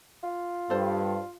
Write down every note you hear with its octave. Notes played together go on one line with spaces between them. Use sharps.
F4
G2 A4 C5